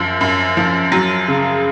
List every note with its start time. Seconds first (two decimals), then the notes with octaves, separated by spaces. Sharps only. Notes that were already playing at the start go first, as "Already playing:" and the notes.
Already playing: F#2 F3
0.21 F#2
0.57 F3
0.92 F#3
1.28 C#3